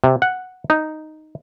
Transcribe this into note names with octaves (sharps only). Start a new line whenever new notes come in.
C3
F#5
D#4